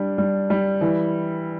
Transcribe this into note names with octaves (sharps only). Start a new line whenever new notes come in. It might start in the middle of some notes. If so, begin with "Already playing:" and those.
Already playing: G3 D4
G3
G3
E3